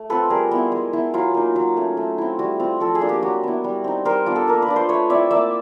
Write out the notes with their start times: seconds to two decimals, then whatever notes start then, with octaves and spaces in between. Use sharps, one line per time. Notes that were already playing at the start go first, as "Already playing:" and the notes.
Already playing: A3
0.10 C4 F4 A4 B4
0.30 G3 G#4 A#4
0.51 B3 E4
0.72 G#3
0.93 B3 E4
1.14 F#3 F4
1.34 A#3 D#4
1.56 F#3
1.77 A3 C#4
1.97 A3
2.18 C4 E4
2.39 G3 F#4
2.60 C4 F4
2.80 F3 A4
2.95 G#4
3.01 A#3 D4 F4
3.09 G4
3.22 F#3 F#4
3.43 B3 E4
3.64 G3
3.84 C4 D#4
4.05 G3 A#4 C5
4.26 B3 D4 F4
4.36 A4
4.47 A#3 A#4
4.62 B4
4.68 D4 F4
4.76 C5
4.89 A3 B4 C#5
5.10 C4 E4 D5 E5
5.31 A#3 D5 E5